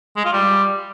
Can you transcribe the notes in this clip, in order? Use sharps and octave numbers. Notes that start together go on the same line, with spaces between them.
G#3
F4
G3